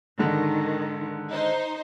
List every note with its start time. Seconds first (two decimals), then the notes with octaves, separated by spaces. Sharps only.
0.19 G#2 D3 D#3
1.31 D#4 C5